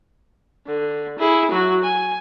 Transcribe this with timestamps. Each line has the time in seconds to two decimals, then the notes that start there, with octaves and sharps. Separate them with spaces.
0.66 D3
1.19 E4 G#4
1.51 F#3 F#4
1.83 G#5